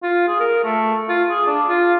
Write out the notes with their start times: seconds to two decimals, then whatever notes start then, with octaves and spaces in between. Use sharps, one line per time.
0.03 F4
0.28 G#4
0.40 A#4
0.64 A3
1.09 F4
1.30 G#4
1.47 D4
1.69 F4